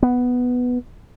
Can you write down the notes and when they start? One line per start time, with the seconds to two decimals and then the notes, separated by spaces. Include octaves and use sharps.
0.03 B3